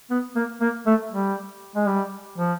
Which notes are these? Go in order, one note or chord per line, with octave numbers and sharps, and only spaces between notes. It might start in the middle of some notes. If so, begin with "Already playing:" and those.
B3
A#3
A#3
A3
G3
G#3
G3
F3